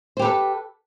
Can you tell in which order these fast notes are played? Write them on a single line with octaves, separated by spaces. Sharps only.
C5 G4 B4 A4